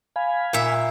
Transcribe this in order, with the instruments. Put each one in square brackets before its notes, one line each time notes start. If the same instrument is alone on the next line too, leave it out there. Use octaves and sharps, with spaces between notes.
[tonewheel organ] F5 G#5 B5
[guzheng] A#2 E5